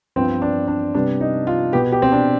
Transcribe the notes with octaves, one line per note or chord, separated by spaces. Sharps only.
G2 F3 B3 C4
D4
D4
C3 G3 B3 D4
D#4
F4
B2 B3 G4
G4
C4
D4